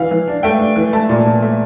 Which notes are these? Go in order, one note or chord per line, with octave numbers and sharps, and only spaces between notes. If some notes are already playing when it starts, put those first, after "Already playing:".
Already playing: E3 F5
E3
D4
A3 G5
D4
E3
A3 A5
A#2
A#2
A3